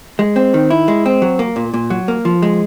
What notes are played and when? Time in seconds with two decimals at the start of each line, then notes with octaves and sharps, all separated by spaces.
0.19 G#3
0.36 C4
0.54 D#3
0.70 E4
0.88 G#3
1.06 C4
1.22 F#3
1.39 A#3
1.56 A#2
1.74 A#2
1.90 F#3
2.08 A#3
2.25 F3
2.42 G#3